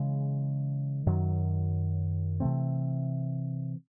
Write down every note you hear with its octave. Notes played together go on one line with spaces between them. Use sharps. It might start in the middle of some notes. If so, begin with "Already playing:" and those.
Already playing: C#3 E3 G#3
F#2 D#3 F#3
C3 E3 A3 C4